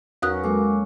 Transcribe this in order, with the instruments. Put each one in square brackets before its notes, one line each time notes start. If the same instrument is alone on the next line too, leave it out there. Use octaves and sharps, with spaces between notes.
[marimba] E2 D#6 F#6 [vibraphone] F#3 B4 [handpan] C#4 F#4 A#4
[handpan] F#3 A#3 A4 [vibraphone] G#3 D6